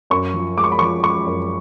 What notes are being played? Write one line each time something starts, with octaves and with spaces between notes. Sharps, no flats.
F#2 C#6
F3
G#3 D6
C#6
B5
F3 C#6
G#3 C#6
F#2